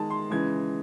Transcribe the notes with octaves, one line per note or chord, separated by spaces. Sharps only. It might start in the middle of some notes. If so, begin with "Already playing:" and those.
Already playing: D#3 G#3 A5
C6
C#3 E3 G#3 G#6